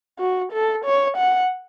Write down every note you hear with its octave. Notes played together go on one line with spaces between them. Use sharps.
F#4
A4
C#5
F#5